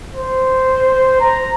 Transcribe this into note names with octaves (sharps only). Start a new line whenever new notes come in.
C5
A#5